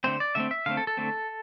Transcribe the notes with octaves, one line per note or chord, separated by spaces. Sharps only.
D3 A3 C4 C5
D5
D3 A3 C4 E5
E5
D3 A3 C4 F5
A4
A4
D3 A3 C4